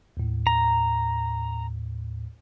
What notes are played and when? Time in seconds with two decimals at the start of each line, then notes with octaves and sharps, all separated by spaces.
0.17 D#2 A2
0.47 A#5